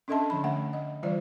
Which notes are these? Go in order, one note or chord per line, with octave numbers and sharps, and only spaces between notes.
C#4 D4 A4 D#5 E5 A5
D3 F3 B5
A3 E5 F#5
D#5
E3 G3 F4 C5 D5